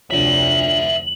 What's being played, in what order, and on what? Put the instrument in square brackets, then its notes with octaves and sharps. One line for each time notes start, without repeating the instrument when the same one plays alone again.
[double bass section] F1 D2 [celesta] D4 F4 C#5 [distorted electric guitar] D5 E5 [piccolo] F#7